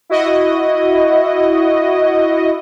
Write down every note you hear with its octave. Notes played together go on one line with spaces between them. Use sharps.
E4 F#4 D#5